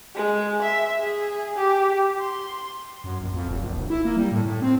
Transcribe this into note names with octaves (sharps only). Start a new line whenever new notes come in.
G#3
E5
G#4
G4
C6
F#2
A#1
F2
F1
A#1
D1
E4
A#3
G3
A2
A2
C4